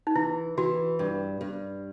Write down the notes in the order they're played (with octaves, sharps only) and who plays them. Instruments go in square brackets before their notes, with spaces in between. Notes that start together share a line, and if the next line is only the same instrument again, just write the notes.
[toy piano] D#4
[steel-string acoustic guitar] E3 [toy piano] E4
[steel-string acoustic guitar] E3 [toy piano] F#4
[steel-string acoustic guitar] G2
G2